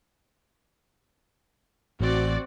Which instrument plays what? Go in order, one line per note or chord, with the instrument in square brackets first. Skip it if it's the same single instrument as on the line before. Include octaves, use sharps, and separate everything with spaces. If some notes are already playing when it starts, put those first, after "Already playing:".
[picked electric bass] A1 [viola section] C4 F#4 D5